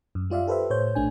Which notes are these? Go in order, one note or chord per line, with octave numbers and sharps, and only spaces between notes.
F#2
G3 F4 D5 E5 F5
G4 A4 B4 C5 E5
A2 C5 C#5 G6
A#1 A3 D4 G#5